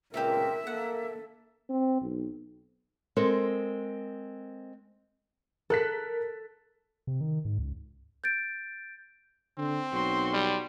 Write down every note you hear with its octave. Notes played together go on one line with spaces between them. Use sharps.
C#2 A#2 C4 E4 G4 A#4 E5
A#3 A4 F#5
C4
B1
G#3 C4 A4 A#4
A4 A#4 F#6 B6
C3
D#3
G#2
C#2
G6 A6 D7
D3 C4
B1 F#4 C6
G3